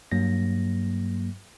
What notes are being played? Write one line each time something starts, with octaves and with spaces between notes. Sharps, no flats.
G2 F#3 A#3 A#6